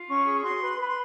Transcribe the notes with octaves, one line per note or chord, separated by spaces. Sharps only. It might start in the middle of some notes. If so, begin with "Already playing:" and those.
Already playing: F4
C#4 C#6
G#4
C#6
F#4 C6
B4
B4 B5
C6